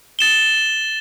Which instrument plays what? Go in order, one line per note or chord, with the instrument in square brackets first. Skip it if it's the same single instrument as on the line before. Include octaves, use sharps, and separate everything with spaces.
[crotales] A6 E7 G7